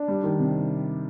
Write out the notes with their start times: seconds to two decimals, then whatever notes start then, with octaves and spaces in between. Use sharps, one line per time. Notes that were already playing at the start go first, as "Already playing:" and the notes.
Already playing: D4
0.08 G3
0.23 D#3
0.39 C3